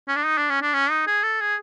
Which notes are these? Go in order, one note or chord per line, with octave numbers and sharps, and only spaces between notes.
C#4
D4
D#4
D4
C#4
D4
C#4
D#4
G#4
A4
G#4